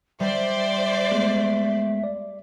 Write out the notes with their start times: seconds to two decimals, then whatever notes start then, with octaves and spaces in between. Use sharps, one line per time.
0.20 G3 C5 D5 E5
1.12 G#3 A3 B3
2.04 D5